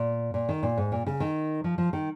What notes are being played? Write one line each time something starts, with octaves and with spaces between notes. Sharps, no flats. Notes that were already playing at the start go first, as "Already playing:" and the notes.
Already playing: A#2
A#2
D#3
A#2
G#2
A#2
C#3
D#3
F3
F3
D#3